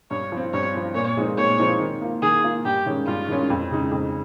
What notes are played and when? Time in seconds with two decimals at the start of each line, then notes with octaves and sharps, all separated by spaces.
0.11 G2 C#5
0.32 F3 C4
0.53 G2 C#5
0.75 F3 C4
0.95 A#2 C#5
1.17 F3 G#3 C4 D#4
1.37 A#2 C#5
1.59 F3 G#3 C4 D#4
1.80 D#3
2.02 A#3 F4
2.22 D#3 G#4
2.44 A#3 F4
2.65 G2 G4
2.86 D#3 G#3 C#4
3.07 G2 F4
3.28 D#3 G#3 C#4
3.50 F2
3.71 C#3 G#3 D#4
3.91 F2